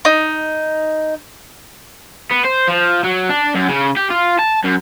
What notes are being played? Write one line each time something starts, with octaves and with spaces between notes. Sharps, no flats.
D#4
B3
C5
F3
F#3
D4
F#2
C#3
G4
F4
A5
F#2